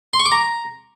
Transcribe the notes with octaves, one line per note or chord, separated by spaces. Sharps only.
C6
C#6
D6
A#5